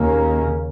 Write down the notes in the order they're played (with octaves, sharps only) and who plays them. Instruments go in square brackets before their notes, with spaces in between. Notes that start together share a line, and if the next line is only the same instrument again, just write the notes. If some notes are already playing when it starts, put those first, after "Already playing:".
Already playing: [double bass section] D#2 C#3 A#3